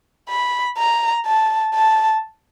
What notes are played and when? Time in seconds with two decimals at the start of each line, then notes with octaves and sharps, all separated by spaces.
0.29 B5
0.78 A#5
1.26 A5
1.74 A5